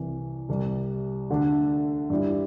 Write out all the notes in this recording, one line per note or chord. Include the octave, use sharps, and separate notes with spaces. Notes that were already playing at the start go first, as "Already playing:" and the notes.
Already playing: C2 C3 E3
C2 C3 G3
D2 D3 A3 D4
G2 G3 E4